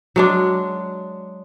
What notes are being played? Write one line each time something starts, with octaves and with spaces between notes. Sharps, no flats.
F#3 G#3 D4